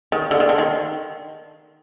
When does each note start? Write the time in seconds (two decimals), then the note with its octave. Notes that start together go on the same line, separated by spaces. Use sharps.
0.12 D#3
0.31 D3
0.40 D#3
0.49 D3
0.58 D#3